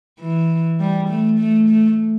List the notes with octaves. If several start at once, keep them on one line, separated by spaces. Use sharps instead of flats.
E3
G3
A3
A3
A3